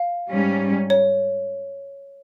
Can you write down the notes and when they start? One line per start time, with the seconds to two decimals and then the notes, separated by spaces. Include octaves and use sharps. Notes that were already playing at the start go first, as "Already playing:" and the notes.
Already playing: F5
0.29 G#2 G3 C#4
0.90 C#5